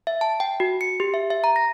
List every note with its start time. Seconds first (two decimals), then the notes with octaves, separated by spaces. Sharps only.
0.07 E5
0.21 A5
0.40 G5
0.60 F#4
0.81 C#7
1.00 G4
1.14 E5
1.30 E5
1.44 A#5
1.56 A#6